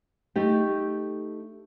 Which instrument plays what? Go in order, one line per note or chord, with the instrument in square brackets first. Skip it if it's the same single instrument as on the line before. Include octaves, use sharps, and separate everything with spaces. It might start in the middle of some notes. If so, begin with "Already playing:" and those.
[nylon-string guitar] A3 D#4 G4